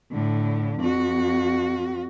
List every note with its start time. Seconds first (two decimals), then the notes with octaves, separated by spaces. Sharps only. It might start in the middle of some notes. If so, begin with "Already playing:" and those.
0.12 A2 D3
0.80 F2 F#4